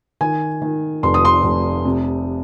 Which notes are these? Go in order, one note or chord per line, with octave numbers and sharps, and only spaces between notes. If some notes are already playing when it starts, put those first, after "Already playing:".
D#3 G#5
D#3
F1 C6
D#6
C6
F1
C3